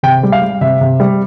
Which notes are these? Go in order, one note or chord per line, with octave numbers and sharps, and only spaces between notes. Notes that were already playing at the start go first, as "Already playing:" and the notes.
C3 G5
G3
F5
G3
C3 E5
C3
G3